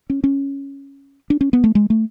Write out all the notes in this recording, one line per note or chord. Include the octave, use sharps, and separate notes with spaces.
C#4
C#4
D4
C#4
B3
A3
G#3
A3